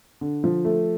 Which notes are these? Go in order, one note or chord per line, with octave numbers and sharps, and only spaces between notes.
D3
F3
A3